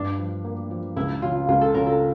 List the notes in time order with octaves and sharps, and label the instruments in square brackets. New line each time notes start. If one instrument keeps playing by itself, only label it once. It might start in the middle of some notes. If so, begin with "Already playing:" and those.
Already playing: [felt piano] G2 [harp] D4
[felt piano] F3
A#3
F3
[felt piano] C#2 [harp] E4
[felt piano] C#3 [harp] F4
[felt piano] C#2 [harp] F4
[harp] A4
[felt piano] C#3 [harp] A#4
[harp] A4